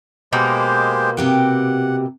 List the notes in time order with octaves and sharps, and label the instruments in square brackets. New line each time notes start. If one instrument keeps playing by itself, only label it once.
[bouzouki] B2 A#3 [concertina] G#3 G4 C5
[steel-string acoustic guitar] C3 G4 G5 [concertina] F#5